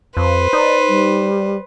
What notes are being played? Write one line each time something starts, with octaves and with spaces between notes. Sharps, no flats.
F2 B4 C5
D#4 D5
G3